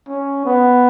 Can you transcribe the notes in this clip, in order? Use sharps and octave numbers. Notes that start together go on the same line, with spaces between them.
C#4
B3